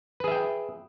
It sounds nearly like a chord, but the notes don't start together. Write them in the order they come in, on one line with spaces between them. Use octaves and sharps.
B4 G#4 E5 G5